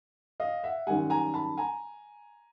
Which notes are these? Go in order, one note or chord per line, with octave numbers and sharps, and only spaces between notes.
D#5 F5
E5 F#5
F#2 D#3 G3 F#5 G#5
G#5 A#5
A5 B5
G#5 A#5